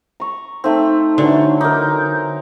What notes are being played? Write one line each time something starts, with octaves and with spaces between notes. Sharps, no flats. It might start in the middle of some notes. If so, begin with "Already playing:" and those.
A#5 C#6
A3 C4 D#4
D3 E3 F#3
D#4 A#4 D6
G6